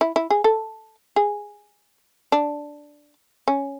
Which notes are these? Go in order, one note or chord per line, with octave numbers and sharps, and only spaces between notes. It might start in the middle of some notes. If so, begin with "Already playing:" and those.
E4
E4
G#4
A4
G#4
D4
C#4